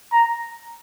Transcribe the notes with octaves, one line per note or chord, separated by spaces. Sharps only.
A#5